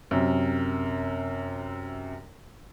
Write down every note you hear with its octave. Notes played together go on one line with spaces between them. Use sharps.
F#2 C3